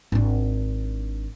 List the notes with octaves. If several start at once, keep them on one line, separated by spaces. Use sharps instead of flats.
G#1 D4